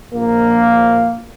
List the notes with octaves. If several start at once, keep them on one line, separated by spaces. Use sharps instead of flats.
A#1 A#3